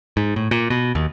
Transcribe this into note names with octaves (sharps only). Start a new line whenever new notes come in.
G#2
A2
A#2
B2
D#2